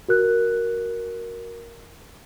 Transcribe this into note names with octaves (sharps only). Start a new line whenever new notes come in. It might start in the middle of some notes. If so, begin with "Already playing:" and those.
F#4 A#4 F#6